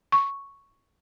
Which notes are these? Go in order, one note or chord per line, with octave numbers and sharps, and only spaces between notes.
C#6